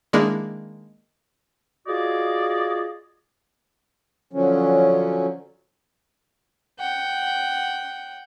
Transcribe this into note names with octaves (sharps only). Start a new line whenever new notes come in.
D#3 G#3 A#3 D4 E4
F4 F#4 G#4 D5 D#5
D3 F3 F#3 C#4
F#5 G5